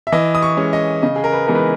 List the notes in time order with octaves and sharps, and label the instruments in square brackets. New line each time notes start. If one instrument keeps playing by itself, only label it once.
[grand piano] E5
E3 D#5
D#6
C#6
G#3 C#4
D#5
C#3 D#5
G#4
A#4
B4
E3 G#3 B3 D#4 A#4
B4